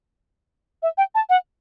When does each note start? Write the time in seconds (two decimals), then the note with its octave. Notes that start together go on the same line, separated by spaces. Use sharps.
0.83 E5
0.97 G5
1.15 A5
1.29 F#5